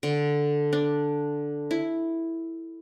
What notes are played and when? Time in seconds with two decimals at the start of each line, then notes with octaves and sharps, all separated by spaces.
0.03 D3
0.73 D4
1.71 E4